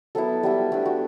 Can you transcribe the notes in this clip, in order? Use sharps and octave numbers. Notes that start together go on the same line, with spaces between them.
F#3 B3 E4 A4
G3 B3 E4
A3 D4 G4
F#4